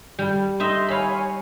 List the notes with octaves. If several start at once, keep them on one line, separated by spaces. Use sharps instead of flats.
G3
D#4 D#5 E5 C6
C#5 F5 G#5 B5